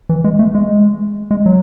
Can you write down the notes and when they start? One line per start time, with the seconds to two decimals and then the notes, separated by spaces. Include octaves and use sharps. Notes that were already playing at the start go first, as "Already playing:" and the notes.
0.09 E3
0.24 G#3
0.39 A3
0.55 G#3
1.31 G#3
1.46 F#3